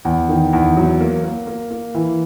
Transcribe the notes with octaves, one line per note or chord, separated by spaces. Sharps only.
E2
D#3
E2
F#3
A#3
A#3
A#3
A#3
E3